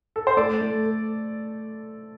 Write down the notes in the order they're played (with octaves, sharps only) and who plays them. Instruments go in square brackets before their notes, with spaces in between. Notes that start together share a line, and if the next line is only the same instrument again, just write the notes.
[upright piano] A4
C5
[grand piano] A3 [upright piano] A4 D5
[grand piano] A3
A4